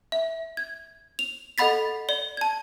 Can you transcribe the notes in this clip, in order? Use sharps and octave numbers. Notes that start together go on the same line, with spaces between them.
E5
G#6
F7
A4 D#5 F#5 B5 A6 B6
D5 G7
A5 G#6